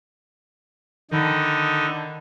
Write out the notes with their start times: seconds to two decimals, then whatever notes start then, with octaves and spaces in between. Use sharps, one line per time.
1.11 D3 D#3 D#4 B5